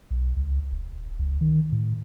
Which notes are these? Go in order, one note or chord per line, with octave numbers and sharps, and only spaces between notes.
B1
C#2
D#1
C#2
D#3
A2